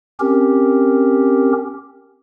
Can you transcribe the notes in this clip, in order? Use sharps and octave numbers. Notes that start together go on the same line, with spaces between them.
C4 C#4 G4 A#4